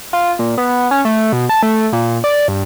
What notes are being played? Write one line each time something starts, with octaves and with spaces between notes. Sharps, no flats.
F4
A#2
B3
C#4
A3
B2
A5
A3
A#2
D5
G2